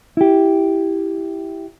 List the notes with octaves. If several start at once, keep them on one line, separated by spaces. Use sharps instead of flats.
E4 G4